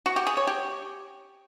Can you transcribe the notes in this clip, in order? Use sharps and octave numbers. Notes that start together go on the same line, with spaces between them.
F#4
G4
G#4
C#5
G4